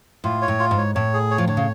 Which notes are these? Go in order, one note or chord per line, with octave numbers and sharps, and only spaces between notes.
A2 F4
C#5
A2
F4
G#2
C#5
A2 C#5
G#4
C#5
F3
D3 C#5
C#3